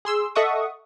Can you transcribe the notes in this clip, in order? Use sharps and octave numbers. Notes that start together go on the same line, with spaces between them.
G#4 C6 E6
A4 D#5 E5 F#5 C#6 D#6